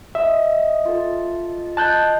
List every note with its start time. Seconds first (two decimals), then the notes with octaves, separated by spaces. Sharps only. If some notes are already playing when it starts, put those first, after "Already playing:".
0.15 D#5 E5 C6
0.85 F4 A4
1.77 D#5 A5 C6 E6 F#6 G6